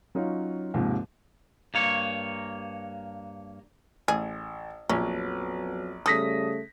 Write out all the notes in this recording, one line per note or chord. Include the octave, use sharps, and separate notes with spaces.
F#3 C#4 D#4 F4
D#2 G#2 C3 F3
G2 A#3 C#5
A1 G#4
A#1 F2 F#3 B3 C#4
C#3 G3 A3 A4 D#6 A#6 B6